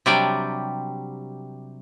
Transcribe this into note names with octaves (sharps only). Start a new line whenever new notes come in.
C3 F#3 G3 D4 D5 G5